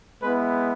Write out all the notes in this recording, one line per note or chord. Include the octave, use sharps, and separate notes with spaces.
G#3 B3 E4 B4